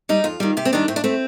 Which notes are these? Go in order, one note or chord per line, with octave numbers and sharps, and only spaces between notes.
G3 D#4
F2 F4
D#3 G3
C3 G4
C4
D#3 G3 D4
A2 C4
D4
A3 C4